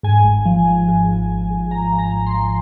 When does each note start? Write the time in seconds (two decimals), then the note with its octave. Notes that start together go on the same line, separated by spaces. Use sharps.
0.03 G#2 G#5
0.24 G#1
0.46 F3
0.67 F3
0.88 G#2
1.08 G#1
1.30 G#1
1.50 G#2
1.71 F3 A#5
1.92 F3
1.99 A#5
2.12 G#1
2.26 C6
2.34 F3